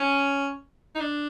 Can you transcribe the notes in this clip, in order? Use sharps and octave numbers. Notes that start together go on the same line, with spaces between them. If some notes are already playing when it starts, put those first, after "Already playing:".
Already playing: C#4
D#4
D4